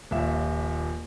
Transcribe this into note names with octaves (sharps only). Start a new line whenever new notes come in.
D#1 A#1 D#2 E5 F5